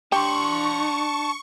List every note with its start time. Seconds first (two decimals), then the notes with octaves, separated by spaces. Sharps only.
0.12 D4 G4 A5 C6 C#6